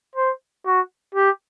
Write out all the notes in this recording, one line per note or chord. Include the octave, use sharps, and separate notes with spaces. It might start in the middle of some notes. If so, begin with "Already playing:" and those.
C5
F#4
G4